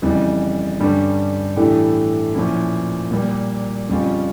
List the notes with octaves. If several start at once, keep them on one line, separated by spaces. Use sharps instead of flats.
F2 C#3 E3 G3
G2 D3 G3 C#4
A2 E3 A3 D4 G4
A#2 F3 C#4 E4
A#2 G3 A#3
F2 C#3 G3 C#4 F4